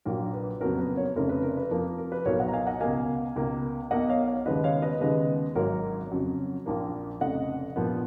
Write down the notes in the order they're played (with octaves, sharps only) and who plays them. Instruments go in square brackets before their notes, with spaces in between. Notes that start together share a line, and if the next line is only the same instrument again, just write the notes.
[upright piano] A#1 A#2 F#3 A#3 A#4
B4
F2 C#3 F#3 B3 A#4
B4
A#4 C#5
F1 F2 C#3 A#4
B4
A#4
B4
F2 F3 A#3 A#4
A#4
B4
B1 A#2 F#3 A#4 C#5
D#5 F#5
A#5
F5 G#5
D#5 F#5
C#2 B2 A#3 F5 G#5
C#2 B2 A#3
B1 B2 A#3 D#5 F#5
C#5 F5
C#5 F5
D#2 C#3 G#3 B3 B4 D#5
C#5 F5
B4 D#5
D#2 C#3 G#3 B3 B4 D#5
G#1 G#2 F#3 A#3 A#4 C#5
F2 C#3 F#3
A#1 A#2 F3 A#3 A#4
F1 F2 C#3 D#5 F#5
A#1 A#2 F3 B3